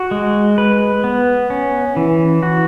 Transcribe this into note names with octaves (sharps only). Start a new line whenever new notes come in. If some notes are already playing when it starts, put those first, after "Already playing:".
Already playing: F#4
G#3
B4
B3
C#4
E3
F#4